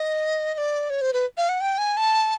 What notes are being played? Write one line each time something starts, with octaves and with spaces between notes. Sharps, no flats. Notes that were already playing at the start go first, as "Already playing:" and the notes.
Already playing: D#5
D#5
D5
C#5
C5
B4
F5
F#5
G5
G#5
A5